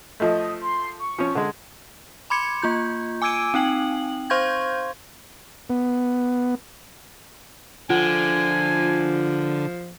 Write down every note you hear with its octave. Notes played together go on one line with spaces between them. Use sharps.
F3 A3 D#5
C6
C#6
F3 C#4
D3 G#3
B5 C6 D6 G#6 C#7
A#3 F4 G6
G#5 D6 E6 G#6 D7 D#7
C4 D#4 G5 F#7
C5 F5 C6 C#6 G6 G#6
B3
D3 F3 F4 G#5